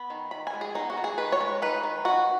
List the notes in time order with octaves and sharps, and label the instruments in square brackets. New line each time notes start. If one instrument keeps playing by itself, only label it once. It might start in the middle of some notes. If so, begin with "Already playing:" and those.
Already playing: [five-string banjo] B3 B5
D#3
D#3 B5
G#5
G#3
G#4
B3 D#4
F#4
D#3
G#4
D#3 B4
C#5
G#3
D#4 B4
D#3
D#3 F#4